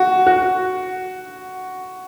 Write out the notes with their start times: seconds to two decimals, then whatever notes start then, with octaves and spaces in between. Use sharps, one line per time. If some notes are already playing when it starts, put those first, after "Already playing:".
Already playing: F#4
0.27 F#4